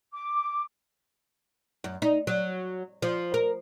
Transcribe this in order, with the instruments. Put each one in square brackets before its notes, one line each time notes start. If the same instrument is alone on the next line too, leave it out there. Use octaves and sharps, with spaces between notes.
[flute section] D6
[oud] F#2
D#4
F#3
F3
A#4